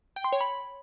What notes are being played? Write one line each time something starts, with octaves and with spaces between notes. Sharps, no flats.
G5
C6
C#5
B5